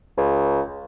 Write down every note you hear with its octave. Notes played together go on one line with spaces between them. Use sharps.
C#2